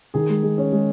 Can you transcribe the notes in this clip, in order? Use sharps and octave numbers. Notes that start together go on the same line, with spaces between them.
D#3 G#4
G#3
G#3
C#4
G#3